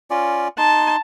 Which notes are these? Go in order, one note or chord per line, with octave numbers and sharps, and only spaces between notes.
C#4 F4 D5
D#4 A5 C6